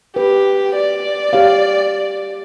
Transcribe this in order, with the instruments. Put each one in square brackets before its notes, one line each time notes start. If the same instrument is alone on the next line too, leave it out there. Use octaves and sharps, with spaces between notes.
[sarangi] G4 [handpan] B4
[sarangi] D5
[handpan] G4 C#5 F5